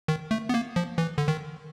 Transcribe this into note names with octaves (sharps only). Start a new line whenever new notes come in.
D#3
A3
B3
A#3
F3
E3
D3
D#3